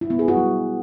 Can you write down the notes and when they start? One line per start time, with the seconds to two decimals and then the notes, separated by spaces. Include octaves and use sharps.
0.01 E4
0.10 B3
0.19 G#4
0.28 F#4
0.37 G3